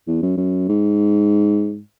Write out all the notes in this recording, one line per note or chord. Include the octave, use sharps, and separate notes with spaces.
E2
F#2
F#2
G#2